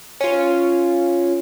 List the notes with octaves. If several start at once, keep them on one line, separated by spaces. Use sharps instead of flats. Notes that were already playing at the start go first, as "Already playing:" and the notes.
C#4 F4